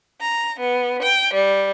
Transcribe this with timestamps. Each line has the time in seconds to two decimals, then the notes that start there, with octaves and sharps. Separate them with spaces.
0.20 A#5
0.59 B3
1.03 G5
1.33 G3